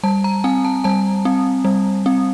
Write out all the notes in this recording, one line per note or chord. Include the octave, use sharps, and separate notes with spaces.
G3 A5
A#5
C4 G#5
A5
G3 A5
C4
G3
C4